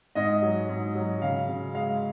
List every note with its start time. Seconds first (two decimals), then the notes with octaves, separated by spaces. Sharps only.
0.15 G#2 D#5
0.42 F#3
0.69 G#2
0.95 F#3
1.22 C#3 F5
1.48 C#3
1.74 G#3 F5